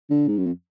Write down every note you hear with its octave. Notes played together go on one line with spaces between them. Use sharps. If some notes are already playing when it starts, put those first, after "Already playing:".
D3
G#2
F#2
F2